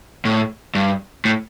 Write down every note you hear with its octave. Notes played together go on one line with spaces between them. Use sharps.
A2
G2
A2